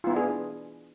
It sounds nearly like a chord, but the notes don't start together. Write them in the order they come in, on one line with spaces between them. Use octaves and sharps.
F4 B3 E4 D4 G#4